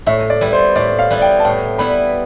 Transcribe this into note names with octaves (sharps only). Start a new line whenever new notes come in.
A2 E5
D5
G3 B3 E4
C5
A2 D5
F5
G3 B3 E4
G5
A5
A2 G5
G3 B3 E4 B5